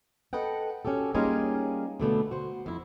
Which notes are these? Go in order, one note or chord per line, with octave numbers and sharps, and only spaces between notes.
A4 B4 D#5 F#5 G5
C#4 F#4 G4 A4
G3 A#3 C#4 D#4 F4 G#4
B2 D3 A3 B3
F#4 C5
F2 E4